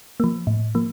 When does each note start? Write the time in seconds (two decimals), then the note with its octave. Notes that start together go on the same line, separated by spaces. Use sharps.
0.20 F3 A#3
0.47 A2
0.75 F3 A#3